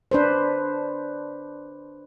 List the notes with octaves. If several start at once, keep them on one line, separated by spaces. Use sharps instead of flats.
D4 B4 C5